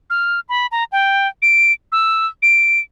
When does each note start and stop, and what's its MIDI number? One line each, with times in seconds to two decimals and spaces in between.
0.10 0.40 89
0.49 0.67 83
0.72 0.84 82
0.92 1.28 79
1.42 1.72 98
1.92 2.26 88
2.42 2.80 98